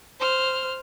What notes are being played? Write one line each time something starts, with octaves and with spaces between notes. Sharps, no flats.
C5 F6